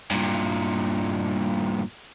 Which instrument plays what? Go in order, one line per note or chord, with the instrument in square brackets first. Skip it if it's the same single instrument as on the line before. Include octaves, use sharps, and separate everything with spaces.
[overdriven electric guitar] G2 A#2